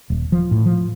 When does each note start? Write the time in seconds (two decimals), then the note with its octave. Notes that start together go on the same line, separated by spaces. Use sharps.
0.10 D#1
0.32 F3
0.51 A2
0.66 F3